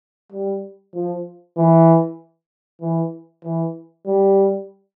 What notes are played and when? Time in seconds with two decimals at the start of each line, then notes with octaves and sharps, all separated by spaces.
0.32 G3
0.94 F3
1.57 E3
2.81 E3
3.44 E3
4.06 G3